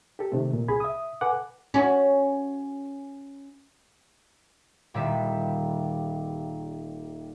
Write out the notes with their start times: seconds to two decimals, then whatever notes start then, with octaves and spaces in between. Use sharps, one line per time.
0.19 G4 A4
0.32 C3 D#3 A3
0.53 A#2
0.68 C2 C3 G#4 B5 G#6
0.80 E5 D#6
1.21 A4 B4 F#5 G#5 D6
1.74 C#4 F#4
4.94 D#1 D#3 G3 E5